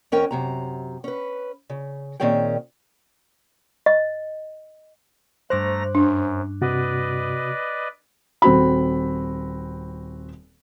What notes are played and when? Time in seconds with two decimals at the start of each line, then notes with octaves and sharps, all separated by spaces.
0.12 F2 C#4 A#4 G5
0.31 F#2 C3 A#5
1.04 C#4 B4
1.70 C#3
2.20 A#2 D#3 C4 C#4 G#4 G5
3.86 D#5
5.50 G2 A3 C5 A#5 D6 F#6 A#6
5.95 F#2 D4
6.61 C3 F#4 B4 D5 D#5
8.42 D#1 C4 F#4 B5